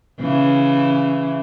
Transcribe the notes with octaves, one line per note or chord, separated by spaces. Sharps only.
C#3 E3